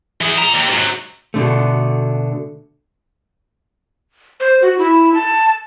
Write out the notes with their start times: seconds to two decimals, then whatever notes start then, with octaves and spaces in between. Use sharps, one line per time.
0.21 E3 G#4
0.39 A#2 A#5
0.54 D#2
0.70 G#2 F#3
1.34 B2 D3 A3
4.40 C5
4.62 F#4
4.78 E4
5.14 A5